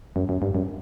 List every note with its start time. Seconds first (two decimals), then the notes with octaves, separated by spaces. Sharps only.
0.16 F#2
0.29 F#2
0.42 G2
0.55 F#2